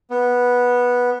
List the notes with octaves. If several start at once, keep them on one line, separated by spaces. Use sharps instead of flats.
B3